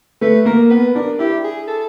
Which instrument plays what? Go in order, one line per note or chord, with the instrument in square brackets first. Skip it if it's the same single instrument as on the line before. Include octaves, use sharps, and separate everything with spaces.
[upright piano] A3 [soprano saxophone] B4
[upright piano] A#3 [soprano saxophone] A#4
[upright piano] B3 [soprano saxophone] B4
[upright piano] D4 [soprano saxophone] A#4
[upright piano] E4 [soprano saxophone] G4
[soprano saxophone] G#4
A4